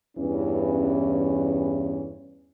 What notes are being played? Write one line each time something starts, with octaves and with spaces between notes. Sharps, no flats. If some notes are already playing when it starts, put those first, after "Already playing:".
E2 G2 E3 C#4